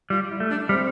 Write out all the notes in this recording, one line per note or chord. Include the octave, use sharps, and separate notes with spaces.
G3 F4
E4
A3
D4
G3 C4